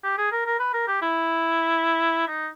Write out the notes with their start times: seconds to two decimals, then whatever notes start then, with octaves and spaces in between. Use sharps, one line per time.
0.04 G4
0.18 G#4
0.32 A#4
0.46 A#4
0.59 B4
0.74 A#4
0.88 G4
1.02 E4
2.28 D#4